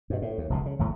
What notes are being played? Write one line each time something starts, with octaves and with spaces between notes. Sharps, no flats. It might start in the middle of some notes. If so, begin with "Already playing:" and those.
G2 B2
A2
D#2
F1 C#2 B2
C#3
G#1 E2 A2 A3